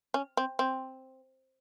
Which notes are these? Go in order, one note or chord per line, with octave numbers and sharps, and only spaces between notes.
C#4
C4
C4